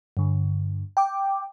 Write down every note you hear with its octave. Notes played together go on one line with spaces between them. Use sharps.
G2 D3
G5 D6